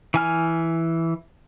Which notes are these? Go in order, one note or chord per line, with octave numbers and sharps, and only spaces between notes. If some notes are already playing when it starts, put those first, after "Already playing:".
E3 G#5 F6